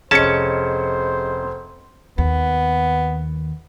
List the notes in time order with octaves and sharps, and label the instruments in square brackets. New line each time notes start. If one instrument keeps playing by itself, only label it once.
[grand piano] F1 C#7 [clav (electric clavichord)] C#4 A5 [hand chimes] G#4 D#5 [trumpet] C5
[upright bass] D#2 [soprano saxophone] B3